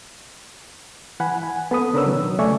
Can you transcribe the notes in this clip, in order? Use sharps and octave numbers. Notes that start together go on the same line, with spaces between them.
E3 F#5 G#5 B5
G#5
B3 A4 B5 D#6
C#3 D4 A#4 B4 C#5 E6
B2 D#3 F#3
C#3 A3 D5 E5 G#5 C#6